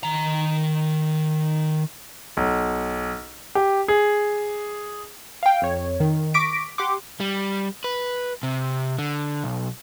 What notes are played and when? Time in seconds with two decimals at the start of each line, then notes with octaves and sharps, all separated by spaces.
0.03 D#3 A#5
2.37 B1
3.55 G4
3.88 G#4
5.43 F5 G5
5.62 F2 C#5
6.00 D#3
6.34 C#6 D6 A#6 B6 D7
6.78 G4 F#5 C6 D6
7.20 G3
7.84 B4
8.43 C3
8.99 D3
9.44 B1